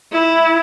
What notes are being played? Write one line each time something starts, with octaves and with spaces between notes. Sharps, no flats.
E4